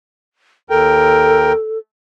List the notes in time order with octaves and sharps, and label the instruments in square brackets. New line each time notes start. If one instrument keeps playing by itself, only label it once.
[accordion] D#2 A#4 G5 [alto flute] A4